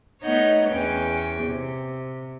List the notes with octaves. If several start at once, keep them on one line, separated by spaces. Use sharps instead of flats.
A3 B3 D#4 C#5 F#5 G6
E2 C#4 B4 G5 G#5
C3